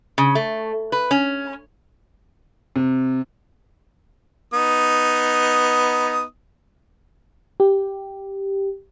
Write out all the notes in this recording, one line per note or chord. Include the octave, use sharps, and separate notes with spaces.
C#3
A3
B4
C#4
C3
B3 D#4 D#6
G4